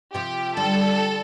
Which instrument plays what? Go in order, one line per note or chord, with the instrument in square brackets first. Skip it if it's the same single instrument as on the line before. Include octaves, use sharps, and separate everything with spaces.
[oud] C3 F3 [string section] G4
[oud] D3 G3 [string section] A4